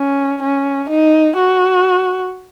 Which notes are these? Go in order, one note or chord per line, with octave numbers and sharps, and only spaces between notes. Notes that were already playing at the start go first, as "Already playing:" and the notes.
Already playing: C#4
C#4
D#4
F#4